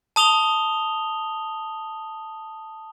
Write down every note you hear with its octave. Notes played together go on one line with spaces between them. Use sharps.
A5 D#6 F7 G7